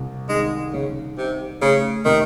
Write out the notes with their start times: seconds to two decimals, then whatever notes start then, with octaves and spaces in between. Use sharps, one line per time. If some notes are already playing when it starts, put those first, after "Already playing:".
Already playing: C2
0.29 D#3 G#3
0.73 C2 C#3
1.17 C3 D#4
1.62 C#3 A3
2.05 C3 D#3